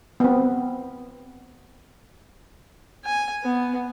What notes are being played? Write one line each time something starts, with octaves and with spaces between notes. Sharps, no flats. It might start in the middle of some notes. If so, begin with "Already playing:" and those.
B3 C4
G#5
B3